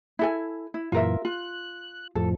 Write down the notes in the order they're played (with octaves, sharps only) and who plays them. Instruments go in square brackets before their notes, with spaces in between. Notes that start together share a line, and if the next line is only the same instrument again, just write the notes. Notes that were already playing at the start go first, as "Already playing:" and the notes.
[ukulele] E4 A4 G#5
E4
[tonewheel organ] F#2 A#2 E3 [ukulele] F4 A#4 E5
[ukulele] F4 [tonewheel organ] F#6
[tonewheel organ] F2 A2 F3 [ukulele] A4